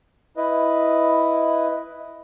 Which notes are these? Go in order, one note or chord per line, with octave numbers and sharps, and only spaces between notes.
E4 B4 D#5